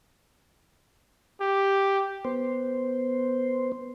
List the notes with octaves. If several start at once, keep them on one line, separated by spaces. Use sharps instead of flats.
G4
B3 C5